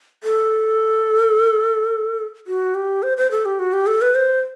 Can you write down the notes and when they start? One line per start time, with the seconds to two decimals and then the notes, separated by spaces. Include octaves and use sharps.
0.24 A4
2.47 F#4
2.75 G4
3.03 C5
3.17 C5
3.31 A4
3.45 G4
3.59 F#4
3.73 G4
3.87 A4
4.02 B4
4.15 C5